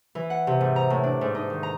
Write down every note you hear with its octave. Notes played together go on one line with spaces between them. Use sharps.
E3
F#5
C3
G#2
A#5
A2
D4
G#2
D#4
D#3
A#5